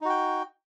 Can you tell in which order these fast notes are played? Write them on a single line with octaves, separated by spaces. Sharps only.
D#4 F#4 G5